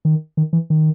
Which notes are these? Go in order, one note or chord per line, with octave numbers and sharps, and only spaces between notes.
D#3
D#3
E3
D#3